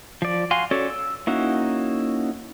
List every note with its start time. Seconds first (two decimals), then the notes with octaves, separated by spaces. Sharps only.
0.22 F3 D5
0.51 F#4 F5 G#5 C6
0.71 C#4 F#4 A4 C#5 D5
0.90 E6
1.27 A#3 C#4 D#4 E4 F#4